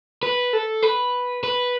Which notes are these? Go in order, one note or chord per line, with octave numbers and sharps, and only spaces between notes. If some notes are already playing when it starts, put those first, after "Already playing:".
B4
A4
B4
B4